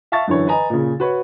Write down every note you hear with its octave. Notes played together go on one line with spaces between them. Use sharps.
E5 F5 A5 C#6 A6
F#2 D3 E3 C#5
B4 D#5 G#5 A#5
A#2 C#3
F#4 B4 C#5